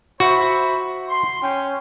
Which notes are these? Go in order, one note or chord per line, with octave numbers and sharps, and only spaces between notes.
F#4 C5 E5 B5
C6
C#4 G5